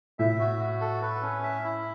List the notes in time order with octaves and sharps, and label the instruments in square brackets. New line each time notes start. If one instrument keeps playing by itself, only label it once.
[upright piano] A2 [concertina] E5
[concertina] F#4
F#4
A4
B4
C#4
E5
E4